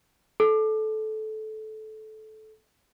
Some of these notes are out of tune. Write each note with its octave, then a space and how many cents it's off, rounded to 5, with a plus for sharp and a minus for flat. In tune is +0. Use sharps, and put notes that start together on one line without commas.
A4 -20